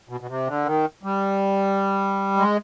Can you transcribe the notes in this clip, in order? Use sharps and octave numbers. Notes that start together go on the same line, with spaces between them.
B2
B2
C3
D3
D#3
G3
G#3